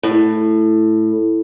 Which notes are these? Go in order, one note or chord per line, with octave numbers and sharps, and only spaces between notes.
A2